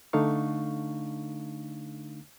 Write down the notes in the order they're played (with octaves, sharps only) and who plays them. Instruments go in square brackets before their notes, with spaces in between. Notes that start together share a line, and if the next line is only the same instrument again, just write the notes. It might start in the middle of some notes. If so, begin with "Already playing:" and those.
[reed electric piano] D3 A3 D4 D#4 F5 C#6